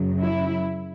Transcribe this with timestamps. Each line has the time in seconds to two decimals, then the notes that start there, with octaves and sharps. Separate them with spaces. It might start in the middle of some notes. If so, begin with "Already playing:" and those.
Already playing: F#2 C#3 F#3
0.21 E4